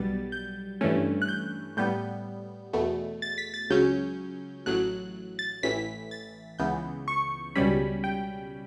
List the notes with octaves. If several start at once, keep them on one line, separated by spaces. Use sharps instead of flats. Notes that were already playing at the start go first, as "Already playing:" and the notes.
Already playing: B1 B2 G3 B3 A6
G6
G2 E3 A3 C#4
F#6
G6
A2 G3 B3 G6
E2 B2 A3
A6
B6
A6
C#2 C#3 F#3 C#4 G6
A1 A2 F#3 F#6
A6
A1 A2 E3 B6
A6
C#2 C#3 E3 B3 G6
C#6
C#2 B2 G3 C#4 B5
G5